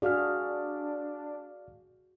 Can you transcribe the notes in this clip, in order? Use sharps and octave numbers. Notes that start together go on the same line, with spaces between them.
D4 F#4 G#4 D5 F5 F6